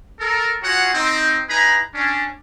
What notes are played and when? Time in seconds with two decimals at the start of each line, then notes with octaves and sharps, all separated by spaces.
0.20 A4 A#4
0.62 F4 F#4 G#4 C#5 F#5
0.94 C4 D#4
1.49 D#4 E4 G#4 B4 A#5 B5
1.95 C#4 D4